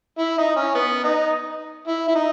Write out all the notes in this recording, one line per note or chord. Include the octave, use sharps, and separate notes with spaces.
E4
D#4
C#4
B3
D#4
E4
E4
D#4